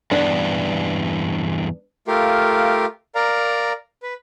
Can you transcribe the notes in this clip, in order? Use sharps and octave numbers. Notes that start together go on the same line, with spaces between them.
E2 G2 B3 D4
A3 F4 G4 A#4 F5
A#4 D5 F5 A#5
B4